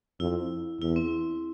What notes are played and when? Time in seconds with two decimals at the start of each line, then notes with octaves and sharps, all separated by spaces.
0.20 F2 E4
0.81 E2 E4
0.96 C4